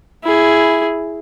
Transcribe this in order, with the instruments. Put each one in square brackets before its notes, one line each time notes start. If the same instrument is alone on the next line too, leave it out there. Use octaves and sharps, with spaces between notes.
[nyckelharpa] E4 G#4